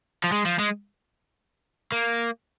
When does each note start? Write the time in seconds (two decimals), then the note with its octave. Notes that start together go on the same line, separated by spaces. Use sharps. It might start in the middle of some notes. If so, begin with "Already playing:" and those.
0.24 F3
0.32 G#3
0.46 F3
0.59 G#3
1.92 A#3